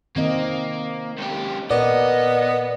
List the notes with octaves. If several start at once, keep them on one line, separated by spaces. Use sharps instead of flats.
D#3 A#3 C4 D#5
C#2 G4
A#2 B3 A#4 D5 D#5